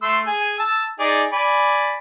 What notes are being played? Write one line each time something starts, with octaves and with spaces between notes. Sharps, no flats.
A3 C6 E6
G#4 G#5
A5 E6
D#4 G#4 D5
D5 G#5 B5